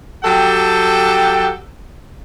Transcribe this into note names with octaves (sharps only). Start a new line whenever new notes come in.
F#3 G4 A4 G5 A5